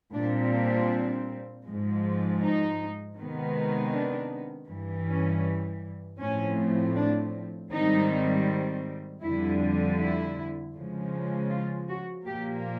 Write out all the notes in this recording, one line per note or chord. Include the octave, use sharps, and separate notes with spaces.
A#2 G3 C4 D4
D4
G#2 F3 G#3
D#4
C3 D#3 G#3 B3
D4
G2 E3 G3
C#4
A2 F3 A3 C4 C#4
D4
G#2 D#3 G3 C4 D#4
F2 D3 G3 E4
E4
C#3 F3 G#3
F4
F#4
A#2 F3 A#3 G4